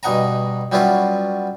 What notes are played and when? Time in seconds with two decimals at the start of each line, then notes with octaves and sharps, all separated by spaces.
0.03 G2 B2 D#5 F#5 G#5 A#5
0.72 F#3 G3 B3 C#4 E4 F4